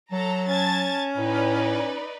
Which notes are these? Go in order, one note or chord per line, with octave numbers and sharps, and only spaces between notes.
F#3 A4 A5 A#5
C#4 A5 G#6 A6
A2 D#4 B4 D5